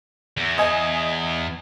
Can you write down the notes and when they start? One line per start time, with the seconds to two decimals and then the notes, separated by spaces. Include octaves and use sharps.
0.37 E2
0.58 D#5 G#5